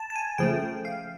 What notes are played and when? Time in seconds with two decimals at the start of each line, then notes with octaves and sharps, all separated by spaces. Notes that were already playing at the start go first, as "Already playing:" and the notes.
Already playing: A5
0.10 A5
0.16 G#5
0.38 C#3 F3 A3 G5
0.85 F5